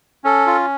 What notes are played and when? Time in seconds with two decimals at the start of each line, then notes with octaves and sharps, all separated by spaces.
0.24 C#4 A4
0.47 F4